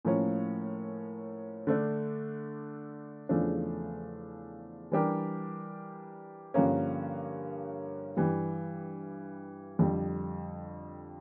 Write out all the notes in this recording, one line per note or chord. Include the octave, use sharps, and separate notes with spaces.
A2 F3 A#3 C#4
D3 A3 D4
E2 C#3 F3 A3 D4
E3 G3 D4 G4 A#4
G2 D3 F3 A#3 C#4
G2 E3 G3
F2 D3 G3